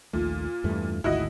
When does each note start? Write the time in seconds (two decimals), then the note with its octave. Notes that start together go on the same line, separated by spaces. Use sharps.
0.13 A#1 D#2 A#2 A3
0.64 E2 G2 A3
1.04 G#1 D2 G#2 E4 F#4 D#5